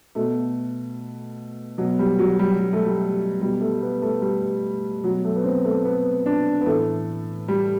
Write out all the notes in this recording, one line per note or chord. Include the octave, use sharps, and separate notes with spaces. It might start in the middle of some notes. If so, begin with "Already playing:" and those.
B2 A3
B2 F#3
G3
F#3
G3
G3
A3
G3
B2 G3
A3
B3
A3
G3
B2 F#3
A3
B3
C4
A3
B3
D4
B3
A2 E3 A3
G3